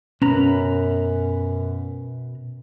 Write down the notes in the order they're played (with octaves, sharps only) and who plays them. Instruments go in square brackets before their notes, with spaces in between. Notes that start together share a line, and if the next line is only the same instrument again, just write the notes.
[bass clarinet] F#2 [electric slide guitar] B2 B4 A#5 [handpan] C#4